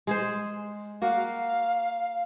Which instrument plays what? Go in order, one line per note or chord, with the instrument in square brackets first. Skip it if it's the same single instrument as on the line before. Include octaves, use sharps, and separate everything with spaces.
[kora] G#3 G#4 C5
[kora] A#3 F#4 [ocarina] F5